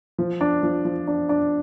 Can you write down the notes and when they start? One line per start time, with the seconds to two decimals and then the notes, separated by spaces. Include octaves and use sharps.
0.18 F3
0.41 D4
0.63 F3
0.85 F3
1.07 D4
1.29 D4